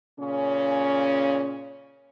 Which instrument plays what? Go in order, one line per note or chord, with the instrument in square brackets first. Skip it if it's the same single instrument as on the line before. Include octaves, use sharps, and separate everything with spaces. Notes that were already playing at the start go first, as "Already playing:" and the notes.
[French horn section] A#2 C#3 C#4